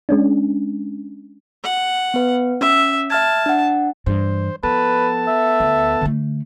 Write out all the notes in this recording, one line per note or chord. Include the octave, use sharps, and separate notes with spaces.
G#3 C#4 D4
F#5
B3 B4
C#4 E5
E5 A5 F6 G#6
D4 F#5
G2 E3 C5
F3 B3 A4 B4 A5
E5
D2
D3 A3